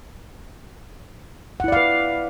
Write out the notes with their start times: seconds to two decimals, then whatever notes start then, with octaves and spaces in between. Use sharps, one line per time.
1.60 F#5
1.64 E4
1.68 D5
1.72 F5
1.77 B4